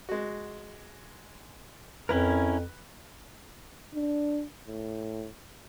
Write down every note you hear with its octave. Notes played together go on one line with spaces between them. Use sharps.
G#3 F#4
F2 C#4 E4 A#4 B4
D4
A2